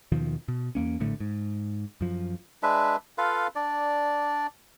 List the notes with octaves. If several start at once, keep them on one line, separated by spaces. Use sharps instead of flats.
D#2 B2 D#3 F3
B2
E2 A#3 C#4
A#1 A2 D3 A3
G#2
F#2 F3
G#3 D4 B4 E5
F4 A4 B4 F5
D4 D5